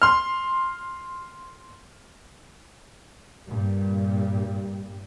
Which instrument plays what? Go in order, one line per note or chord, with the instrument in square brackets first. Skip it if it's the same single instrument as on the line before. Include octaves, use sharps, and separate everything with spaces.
[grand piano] C6 F6
[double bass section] G2 A#2 G3